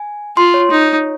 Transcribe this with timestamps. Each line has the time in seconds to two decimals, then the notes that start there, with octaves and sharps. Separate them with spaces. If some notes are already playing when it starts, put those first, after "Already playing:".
Already playing: G#5
0.37 F4 C6
0.54 C#5
0.71 D#4